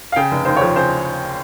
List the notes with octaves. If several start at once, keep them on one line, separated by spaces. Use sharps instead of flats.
F5
C#3 G5
F1
D#2 C5
F3 C#5
C#3 C5